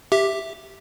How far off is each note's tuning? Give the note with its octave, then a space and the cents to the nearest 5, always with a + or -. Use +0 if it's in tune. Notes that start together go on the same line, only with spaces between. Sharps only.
G4 +0 E5 +0